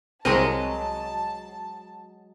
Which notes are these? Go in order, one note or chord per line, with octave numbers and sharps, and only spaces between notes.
C2 F#3 G#3 C4 A#4 D#5 A5